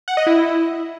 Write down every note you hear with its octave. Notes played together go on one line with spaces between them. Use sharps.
F#5
D#5
E4